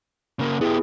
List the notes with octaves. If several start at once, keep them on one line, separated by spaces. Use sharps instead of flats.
C#3 A#3
B3 E4 G4 G#4